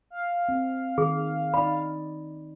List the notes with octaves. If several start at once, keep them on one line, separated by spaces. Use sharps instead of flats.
F5
C4
D#3 G#4
D#4 D5 B5